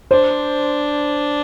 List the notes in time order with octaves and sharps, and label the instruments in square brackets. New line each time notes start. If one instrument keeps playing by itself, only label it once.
[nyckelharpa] D4 [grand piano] C5